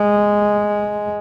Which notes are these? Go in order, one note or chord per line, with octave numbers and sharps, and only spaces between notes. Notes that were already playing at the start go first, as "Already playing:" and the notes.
Already playing: G#3